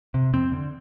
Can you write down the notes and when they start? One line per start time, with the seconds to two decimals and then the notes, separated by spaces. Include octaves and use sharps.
0.14 C3
0.33 F2 C4
0.52 D3